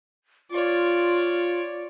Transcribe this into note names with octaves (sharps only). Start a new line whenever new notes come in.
F4 C#5 D5